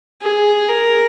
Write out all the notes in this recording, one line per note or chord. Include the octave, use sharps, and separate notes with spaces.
G#4
A#4